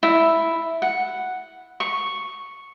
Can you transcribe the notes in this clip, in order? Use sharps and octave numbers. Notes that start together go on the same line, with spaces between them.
E4
F#5
C#6